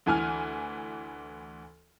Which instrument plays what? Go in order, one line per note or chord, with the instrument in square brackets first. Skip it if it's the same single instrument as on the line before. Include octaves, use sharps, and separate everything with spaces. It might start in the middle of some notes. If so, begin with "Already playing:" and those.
[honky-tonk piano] D2 E3 G#5 F6